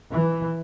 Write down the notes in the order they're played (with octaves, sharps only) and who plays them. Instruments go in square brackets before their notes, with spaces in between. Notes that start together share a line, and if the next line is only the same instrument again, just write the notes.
[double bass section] E3